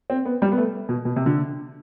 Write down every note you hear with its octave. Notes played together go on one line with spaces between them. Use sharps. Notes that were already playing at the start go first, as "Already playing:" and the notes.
C4
B3
G3
B3
A3
B2
B2
C3
D3